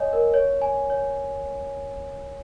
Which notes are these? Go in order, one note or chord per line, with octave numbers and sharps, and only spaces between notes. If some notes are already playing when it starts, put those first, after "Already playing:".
Already playing: C#5 D#5 G#5
A#4
C#5
G#5
C#5